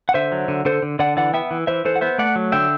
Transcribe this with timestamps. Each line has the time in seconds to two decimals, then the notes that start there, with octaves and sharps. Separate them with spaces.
0.09 F#5
0.14 D3 C5 E5
0.32 F#3
0.48 D3
0.65 D3 A4 C5
0.83 D3
0.99 D3 D5 F#5
1.17 E3 D5 F#5
1.34 B3 E5 G5
1.51 E3
1.67 E3 C5 E5
1.85 E3 A4 C5
1.96 F#5
2.01 B3 C5 E5
2.18 A3 D5 F#5
2.36 F#3
2.52 D3 E5 G5